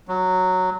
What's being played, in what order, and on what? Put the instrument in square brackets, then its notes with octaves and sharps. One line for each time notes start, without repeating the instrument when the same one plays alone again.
[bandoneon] F#3